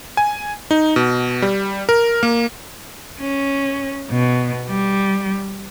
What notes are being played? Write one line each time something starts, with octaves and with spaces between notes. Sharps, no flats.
G#5
D#4
B2
G3
A#4
A#3
C#4
B2
G3